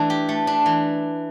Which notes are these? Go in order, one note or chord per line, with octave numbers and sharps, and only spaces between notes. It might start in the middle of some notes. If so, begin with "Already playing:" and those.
Already playing: E3 A3 D4
G4
A3
D4
E3